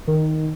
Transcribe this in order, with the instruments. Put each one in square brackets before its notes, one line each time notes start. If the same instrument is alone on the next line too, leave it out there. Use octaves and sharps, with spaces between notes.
[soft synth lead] D#3